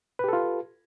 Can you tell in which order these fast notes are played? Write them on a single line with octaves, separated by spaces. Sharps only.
B4 G4 A4 F4